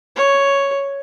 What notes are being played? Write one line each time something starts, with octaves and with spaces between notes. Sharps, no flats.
C#5